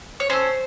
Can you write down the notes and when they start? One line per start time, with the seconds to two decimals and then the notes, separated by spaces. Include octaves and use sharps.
0.20 C#5
0.30 C#4 A4 C5